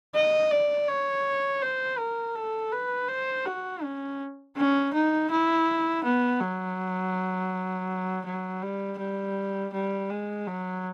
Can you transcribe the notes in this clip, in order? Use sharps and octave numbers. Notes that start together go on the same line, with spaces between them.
D#5
D5
C#5
C5
A#4
A4
B4
C5
F#4
C#4
C#4
D#4
E4
B3
F#3
F#3
G3
G3
G3
G#3
F#3